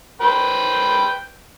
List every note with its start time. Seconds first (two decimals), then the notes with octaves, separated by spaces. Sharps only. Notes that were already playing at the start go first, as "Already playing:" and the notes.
0.21 B4 C5 G5